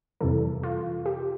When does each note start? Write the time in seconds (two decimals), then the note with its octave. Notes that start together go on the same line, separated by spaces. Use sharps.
0.21 F2 C3 E3 G3 A4
0.63 F4
1.06 G4